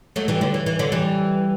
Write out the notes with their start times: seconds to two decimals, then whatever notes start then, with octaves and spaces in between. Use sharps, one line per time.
0.16 F#3 A3
0.28 E3 G3
0.41 D3 F#3
0.54 E3
0.66 E3
0.79 D3 F#3
0.92 E3 G3